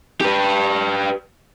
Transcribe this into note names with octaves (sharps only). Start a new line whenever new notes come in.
G4 B4